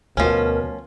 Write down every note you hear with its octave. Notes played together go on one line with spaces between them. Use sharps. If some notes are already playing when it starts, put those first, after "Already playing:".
D2 B2 F3 C#4 A#4